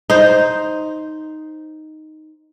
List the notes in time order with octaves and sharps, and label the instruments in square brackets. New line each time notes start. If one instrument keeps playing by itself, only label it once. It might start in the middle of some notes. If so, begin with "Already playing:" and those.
[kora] D#4 C5